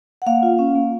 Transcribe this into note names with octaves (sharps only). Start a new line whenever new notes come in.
F#5
A#3 F5
F4
C#4
A#3